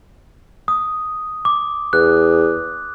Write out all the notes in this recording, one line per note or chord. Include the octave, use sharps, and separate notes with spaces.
D#6
D6
E2 F#6